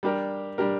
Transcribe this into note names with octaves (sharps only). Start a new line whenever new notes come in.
G3 D4 G4 A#4
G3 D4 G4 A#4